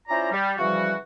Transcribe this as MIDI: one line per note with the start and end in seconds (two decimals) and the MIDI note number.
0.08 0.29 61
0.08 0.29 64
0.08 0.29 65
0.08 0.29 72
0.08 0.29 74
0.08 0.29 82
0.31 0.53 55
0.58 0.94 49
0.58 0.94 52
0.58 0.94 53
0.58 0.94 55
0.58 0.94 66